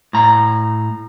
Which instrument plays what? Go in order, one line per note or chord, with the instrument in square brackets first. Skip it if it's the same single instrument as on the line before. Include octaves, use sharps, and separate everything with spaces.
[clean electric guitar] A2 A#5